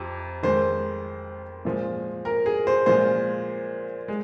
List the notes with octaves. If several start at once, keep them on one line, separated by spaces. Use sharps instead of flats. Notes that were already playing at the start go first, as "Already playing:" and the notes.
Already playing: F2 C3
F2 D#3 G#3 C5
A#2 F3 G#3
A#4
G#4
C5
A#2 F3 G#3 C5
G#3